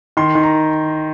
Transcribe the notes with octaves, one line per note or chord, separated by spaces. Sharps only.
D#3 C6
D#3
A#5